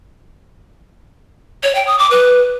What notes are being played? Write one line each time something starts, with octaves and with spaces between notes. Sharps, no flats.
C#5
G5
D#6
D6
B4